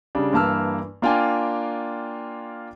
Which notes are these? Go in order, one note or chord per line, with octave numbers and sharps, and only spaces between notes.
C#3 G3 D4
G2 E3 A#3 A5 E6 F6
A#3 D4 F4 F5 G5 G#5